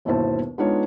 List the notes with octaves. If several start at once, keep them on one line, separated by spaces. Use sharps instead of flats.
G1 D#2 B2 E4 C5 A5
G#3 B3 D4 D#4 F4 C#5